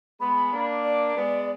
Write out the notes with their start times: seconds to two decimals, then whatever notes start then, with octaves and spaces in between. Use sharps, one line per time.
0.20 G#3 B3 B5
0.53 A#3 D4
0.84 D5
1.16 G#3 B3